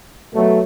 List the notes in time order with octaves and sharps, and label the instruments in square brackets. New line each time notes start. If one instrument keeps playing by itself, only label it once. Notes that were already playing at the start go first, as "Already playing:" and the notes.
[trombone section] B2 F#3 A3